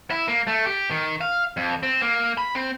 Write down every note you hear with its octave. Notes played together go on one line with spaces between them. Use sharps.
E4
A#3
A3
G4
D#3
F5
F2
C4
A#3
B5
C4